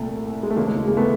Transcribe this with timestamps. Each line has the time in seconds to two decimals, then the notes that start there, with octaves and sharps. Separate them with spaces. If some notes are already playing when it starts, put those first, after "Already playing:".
Already playing: C2 A#2 A3
0.43 G#3
0.50 A3
0.56 D#2 C#3 E3 G#3 A#3
0.67 G#3
0.88 G#3 A#3
0.97 A3 B3